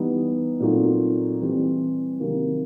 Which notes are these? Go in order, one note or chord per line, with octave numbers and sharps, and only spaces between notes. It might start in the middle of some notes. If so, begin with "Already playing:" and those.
Already playing: E3 G3 B3 D#4
A#2 F#3 A3 C4 D#4
E3 G3 C4
C3 D#3 F#3 A#3